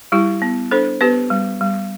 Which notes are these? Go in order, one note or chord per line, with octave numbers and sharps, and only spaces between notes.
G3 E4 G4
B3
D4 A4 C5
B3 G4 B4
G3
G3